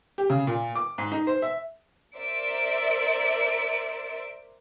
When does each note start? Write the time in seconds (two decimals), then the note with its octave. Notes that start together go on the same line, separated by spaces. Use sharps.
0.18 G4
0.30 C#3
0.47 A#2
0.75 D6
0.98 G#2
1.12 D#4
1.27 C5
1.42 E5
2.17 A#4 C5 D5 E5 D7